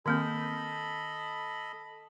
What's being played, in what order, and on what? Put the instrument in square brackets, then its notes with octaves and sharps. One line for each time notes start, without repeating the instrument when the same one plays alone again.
[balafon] D#3 A#3 C4 [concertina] A4 D#5 B5